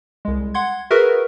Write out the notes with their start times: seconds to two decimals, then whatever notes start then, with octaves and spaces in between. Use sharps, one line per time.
0.25 C2 G#3
0.54 F#5 C6 G#6
0.90 F#4 G#4 A#4 B4 E5